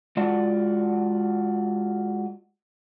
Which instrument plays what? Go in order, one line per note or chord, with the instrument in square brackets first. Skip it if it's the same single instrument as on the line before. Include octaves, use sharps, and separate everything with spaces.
[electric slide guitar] G#3 F4 F#4 D5 F#5